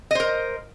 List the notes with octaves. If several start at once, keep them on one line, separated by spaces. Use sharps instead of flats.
A#4 C5 D#5